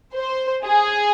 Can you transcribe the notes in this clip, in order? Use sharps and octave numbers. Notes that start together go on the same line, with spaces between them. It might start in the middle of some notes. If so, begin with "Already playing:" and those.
C5
G#4